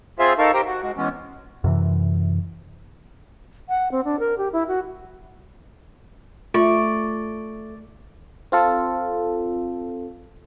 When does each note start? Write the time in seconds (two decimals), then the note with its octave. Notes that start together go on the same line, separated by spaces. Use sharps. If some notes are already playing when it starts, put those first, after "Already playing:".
0.19 C4 F4 G#4 C5 E5 F5
0.39 D#4 A4 A#4 F5 A5 C#6
0.54 G4 A#4 C5 G5 A#5
0.66 F#4
0.83 G#3 F#4
0.97 E3 G#3 B3 C#4
1.64 F#2 C3 E3
3.69 F#5
3.91 C4
4.05 D4
4.19 A#4
4.38 G4
4.53 E4
4.68 F#4
6.54 A3 F4 D5 C#6
8.52 C4 F4 A4